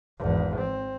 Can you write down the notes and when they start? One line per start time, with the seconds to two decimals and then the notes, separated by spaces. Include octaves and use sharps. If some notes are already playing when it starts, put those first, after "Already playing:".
0.19 G#1 E2
0.59 C4